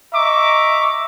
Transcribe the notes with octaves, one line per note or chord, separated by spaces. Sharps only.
D#5 E5 A#5 C#6 D6